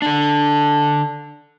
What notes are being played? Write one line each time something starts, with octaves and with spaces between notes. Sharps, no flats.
D3 D4